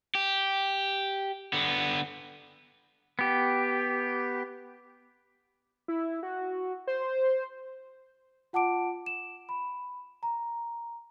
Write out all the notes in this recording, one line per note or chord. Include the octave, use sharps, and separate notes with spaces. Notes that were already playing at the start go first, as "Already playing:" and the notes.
G4
D3 B3
B3 G4
E4
F#4
C5
F4 F#5 A5 D6 D7
E7
B5
A#5